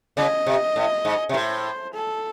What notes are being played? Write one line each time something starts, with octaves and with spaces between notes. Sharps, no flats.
C#3 D#5
C3
A2
G#2
C3
A2 C5
A4